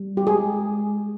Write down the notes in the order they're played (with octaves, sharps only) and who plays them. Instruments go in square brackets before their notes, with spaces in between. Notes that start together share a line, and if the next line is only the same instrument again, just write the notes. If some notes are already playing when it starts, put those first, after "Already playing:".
Already playing: [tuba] G3
[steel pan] G4
[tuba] G#3 [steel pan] G#4